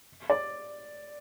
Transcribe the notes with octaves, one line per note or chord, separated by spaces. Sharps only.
D5